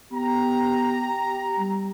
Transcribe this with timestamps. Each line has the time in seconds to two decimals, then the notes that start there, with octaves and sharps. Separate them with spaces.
0.12 B3 G4 A#5
1.58 G3